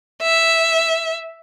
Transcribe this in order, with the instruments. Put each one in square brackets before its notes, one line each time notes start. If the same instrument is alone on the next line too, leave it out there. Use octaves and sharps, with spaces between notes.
[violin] E5